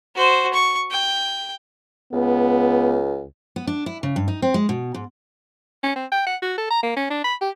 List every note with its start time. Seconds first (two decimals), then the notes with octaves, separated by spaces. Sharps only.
0.15 F#4 C5
0.53 C#6
0.90 G5
2.13 C#2 B3
3.56 B3
3.67 D4
3.86 E4
4.03 C#3
4.16 G2
4.28 D#4
4.42 C4
4.54 G#3
4.69 B2
4.94 G#2
5.83 C#4
5.96 C4
6.12 G5
6.27 F#5
6.42 F#4
6.58 A4
6.70 A#5
6.83 A#3
6.96 C#4
7.10 D4
7.24 B5
7.41 G4